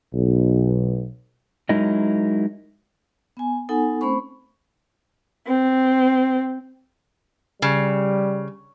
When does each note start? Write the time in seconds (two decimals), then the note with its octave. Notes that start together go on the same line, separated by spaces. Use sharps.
0.13 B1
1.69 F#3 G#3 D#4 E4 A#4 D#5
3.37 B3 G#5
3.69 B3 D#4 A4 F#5 G#5
4.01 A3 C4 C#4 C5 B5 C#6
5.46 C4
7.62 C#3 G3